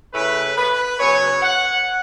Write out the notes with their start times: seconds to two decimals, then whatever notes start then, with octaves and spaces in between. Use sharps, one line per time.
0.13 C#3 A3 C#4 E4 B4
0.56 B4
0.99 C#3 F#3 B3 C#5
1.42 F#5